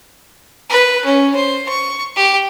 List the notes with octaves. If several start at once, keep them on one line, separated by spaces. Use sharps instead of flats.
B4
C#4
C5
C#6
G4